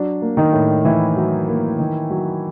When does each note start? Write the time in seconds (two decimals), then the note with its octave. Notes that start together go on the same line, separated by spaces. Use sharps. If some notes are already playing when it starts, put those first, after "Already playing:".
Already playing: F#3 D4
0.22 A#3
0.37 D#3 D#4
0.53 A2
0.84 A2 E3 E4
1.16 F#3
1.48 A#3
1.79 D#3
2.10 F#3